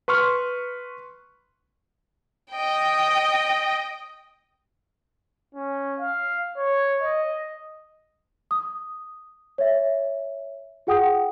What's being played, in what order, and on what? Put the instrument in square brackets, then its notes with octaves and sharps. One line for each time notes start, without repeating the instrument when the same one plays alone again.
[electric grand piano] B4 C6 C#6 F6
[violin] D#5 G5
[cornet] C#4
F5
C#5
D#5
[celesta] D#6
C#5 E5
F4 G#4 F#5 G5 D#6